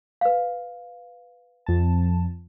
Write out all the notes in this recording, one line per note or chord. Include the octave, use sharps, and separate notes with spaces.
B4 F5
F2 A5